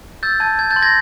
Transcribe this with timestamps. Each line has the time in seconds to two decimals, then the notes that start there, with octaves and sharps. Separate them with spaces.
0.23 E6 G6 A6
0.40 A5 G#6
0.59 G6 G#6
0.71 G6 A6
0.76 C6
0.82 G#6 A#6